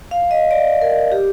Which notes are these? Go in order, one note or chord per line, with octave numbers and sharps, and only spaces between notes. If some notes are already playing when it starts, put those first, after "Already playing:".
F5
D#5
D5
A#4
G4